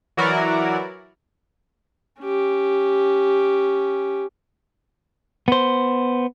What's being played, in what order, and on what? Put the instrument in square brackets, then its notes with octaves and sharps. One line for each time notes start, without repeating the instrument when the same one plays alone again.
[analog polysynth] E3 F#3 E4 F#4 A#4 D5
[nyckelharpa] C#4 G4
[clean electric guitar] B3 C5